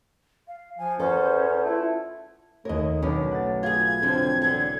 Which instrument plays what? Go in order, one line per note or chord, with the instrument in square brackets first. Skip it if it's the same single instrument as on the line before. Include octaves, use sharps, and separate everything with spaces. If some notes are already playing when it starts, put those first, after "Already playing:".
[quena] F5
[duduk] F3 [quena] G#5
[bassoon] E2 [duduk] C#4 [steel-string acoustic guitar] A4 [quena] C5
[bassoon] A3 [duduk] E4 [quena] F4
[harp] D#2 G#4 C#5 [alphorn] A3 [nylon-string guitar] A#4 D#5
[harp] B1 D#4 D6 [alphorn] D3 [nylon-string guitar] C#4
[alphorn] A3 [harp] F#5 A6
[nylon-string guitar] F4 G#4 [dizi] G#6
[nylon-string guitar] F2 D3 F3 [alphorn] C4
[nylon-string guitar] E2 D3